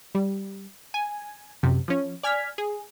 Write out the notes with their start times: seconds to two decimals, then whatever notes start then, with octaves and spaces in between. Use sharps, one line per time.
0.15 G3
0.94 G#5
1.63 F#2 C3
1.88 F3 C#4
2.23 D5 G#5 F6 G#6 B6
2.58 G#4